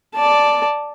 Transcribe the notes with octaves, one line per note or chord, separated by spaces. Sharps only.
D5 A5